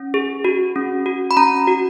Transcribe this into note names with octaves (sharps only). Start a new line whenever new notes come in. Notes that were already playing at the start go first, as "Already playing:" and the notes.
Already playing: C#4
G#4
F#4
C#4
F#4
B5
C#4 A#5
F#4